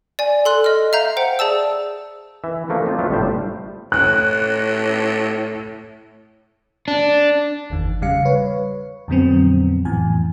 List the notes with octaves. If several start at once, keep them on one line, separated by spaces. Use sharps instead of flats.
D5 G#5
A4 C6 F#6
D#5 F6
E5 F5 A#5 G6
C5 F#5 G5
G#4 D5 A5 E6
E3 E5
E3 F3 A3 A#3 D4
C4 D#4 F4
F3 F#3 A3 B3 D4 F4
G1 A2 G3 G4 C5 A5
A2 F#6
D4
G1 E2 D#3
C#3 G3 F5 C#7
B4 C#5
F2 A#2 D3 F#3 B3 C4
F2 A2 E3 G#5